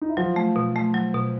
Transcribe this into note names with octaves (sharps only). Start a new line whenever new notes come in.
D#4
E4
F3 F#3 F4
A3
B2
A3
F#3
B2